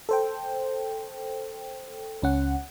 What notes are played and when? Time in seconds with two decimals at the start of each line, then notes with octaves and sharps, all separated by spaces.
0.09 A4 C5 G5
2.22 C#2 C#4 F#5